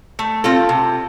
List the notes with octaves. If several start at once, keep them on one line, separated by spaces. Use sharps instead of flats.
A3
C4 F4 A4
C3